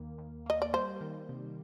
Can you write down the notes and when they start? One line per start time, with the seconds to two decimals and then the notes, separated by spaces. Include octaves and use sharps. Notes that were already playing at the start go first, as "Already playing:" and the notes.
Already playing: D#2 A#3
0.18 D#2
0.46 A#3 D#5
0.62 D5
0.73 G3 C5
1.01 D#3
1.29 C3